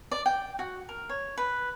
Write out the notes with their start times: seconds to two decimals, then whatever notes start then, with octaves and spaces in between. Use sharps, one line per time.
0.12 D5
0.26 G5
0.59 F#4
0.89 A#4
1.09 C#5
1.38 B4